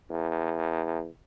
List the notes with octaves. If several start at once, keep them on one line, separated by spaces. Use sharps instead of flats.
E2